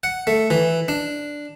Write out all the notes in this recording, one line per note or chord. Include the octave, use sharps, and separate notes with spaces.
F#5
A3
E3
D4